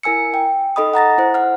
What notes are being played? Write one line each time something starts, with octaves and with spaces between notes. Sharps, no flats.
E4 A#4 G#5 E6 C#7
G5
D#4 A4 D#5 B5 D#6
F#5 A#5 A6 A#6
E4 C5
F#5 F6